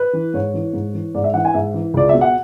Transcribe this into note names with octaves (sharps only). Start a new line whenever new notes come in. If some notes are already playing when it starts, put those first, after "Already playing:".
Already playing: B4
E3
G#2 C#5
E3
G#2
E3
G#2 D5
E5
E3 F#5
G#5
G#2 E5
E3
C#2 D5
B2 E5
F#5